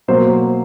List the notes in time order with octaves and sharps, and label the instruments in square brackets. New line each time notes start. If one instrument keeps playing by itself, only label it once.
[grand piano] B2 F#3 A#3 C5